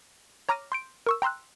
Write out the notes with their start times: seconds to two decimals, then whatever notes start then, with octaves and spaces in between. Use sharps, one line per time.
0.49 C#5 A#5 D6 F6 A#6 D#7
0.72 C6 G6 D7
1.06 A#4 C#6 E6
1.22 G5 A#5 C6 E6 F#6